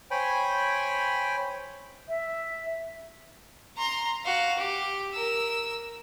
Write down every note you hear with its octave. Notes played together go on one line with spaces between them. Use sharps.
C5 C#5 G5 G#5 B5
E5
A#5 C6
F#4 F5
G4
A#4 E6